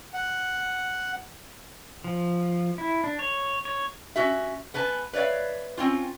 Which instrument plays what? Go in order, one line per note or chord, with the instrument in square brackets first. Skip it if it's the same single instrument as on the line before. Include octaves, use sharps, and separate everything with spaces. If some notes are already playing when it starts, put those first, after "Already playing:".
[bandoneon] F#5
[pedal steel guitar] F3
E4
D4
C#5
C#5
[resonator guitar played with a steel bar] C#4 F#4 E5
B3 B4 G#5 A5
B4 C#5 D5 E5 F5
C4 C#4 F4